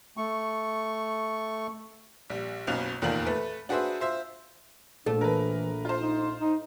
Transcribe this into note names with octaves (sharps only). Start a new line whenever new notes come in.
A3 C#6
A#1 G3
F#1 B1 B2 C#4 F5 F7
F1 E2 A#2 D#3 F4 F#7
A3 B4
D4 F#4 G#4 B4 C5 E5
F4 C5 E5
A#1 A3 D4
E3 A#4 B4
F4 C5
D#4
D#4